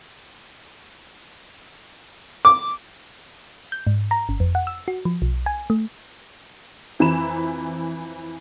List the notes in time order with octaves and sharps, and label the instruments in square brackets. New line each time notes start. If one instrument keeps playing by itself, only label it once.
[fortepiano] D6
[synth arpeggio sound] G6
G#2
A#5
G1
F2
F#5
E6
F#4
F3
B1
G#5
A3
[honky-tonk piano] F2 E3 A#5 B5 E7